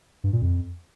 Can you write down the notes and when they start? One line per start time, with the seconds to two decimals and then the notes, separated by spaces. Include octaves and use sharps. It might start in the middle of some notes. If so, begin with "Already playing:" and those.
0.24 G2
0.33 A#2
0.42 F2